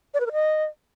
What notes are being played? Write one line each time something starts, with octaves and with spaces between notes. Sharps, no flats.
D5
B4
A#4
D#5